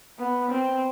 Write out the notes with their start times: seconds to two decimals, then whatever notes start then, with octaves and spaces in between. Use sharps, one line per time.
0.19 B3
0.51 C4